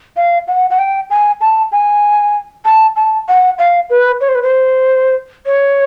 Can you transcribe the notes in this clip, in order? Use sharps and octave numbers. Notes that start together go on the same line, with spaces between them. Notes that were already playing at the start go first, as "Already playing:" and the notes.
F5
F#5
F#5
G5
G#5
A5
G#5
A5
A5
F#5
F5
B4
C#5
C5
B4
C5
C#5